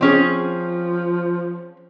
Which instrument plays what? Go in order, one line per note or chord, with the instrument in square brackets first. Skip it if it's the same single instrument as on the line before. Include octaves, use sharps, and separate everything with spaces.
[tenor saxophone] F3 [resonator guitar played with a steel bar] C4 C#4 G#4